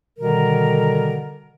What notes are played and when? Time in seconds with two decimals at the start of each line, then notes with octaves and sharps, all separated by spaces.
0.18 B2 D3 D#3 G3 A#4